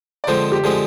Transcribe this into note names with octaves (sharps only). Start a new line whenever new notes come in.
D5
D3 F3 G#3 C4 C5
G4
D3 F3 G#3 C4 G#4